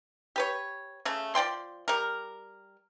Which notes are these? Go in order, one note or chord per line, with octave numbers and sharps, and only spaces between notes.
G4 B4 C#5
C#3 A3
F3 D5 G5 C6
G3 A#4